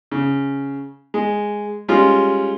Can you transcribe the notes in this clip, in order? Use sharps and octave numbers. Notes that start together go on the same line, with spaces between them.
C#3
G#3
G3 G#3 C#4 F4